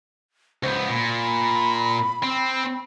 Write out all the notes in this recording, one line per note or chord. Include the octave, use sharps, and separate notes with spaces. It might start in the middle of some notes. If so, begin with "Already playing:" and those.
C#2 B3 C5
A#2 B5
C4